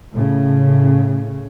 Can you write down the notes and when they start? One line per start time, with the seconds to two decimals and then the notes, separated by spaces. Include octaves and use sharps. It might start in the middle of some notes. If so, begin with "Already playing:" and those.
0.13 A2 C#3